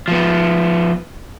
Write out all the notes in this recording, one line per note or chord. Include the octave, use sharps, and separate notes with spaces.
F3 B3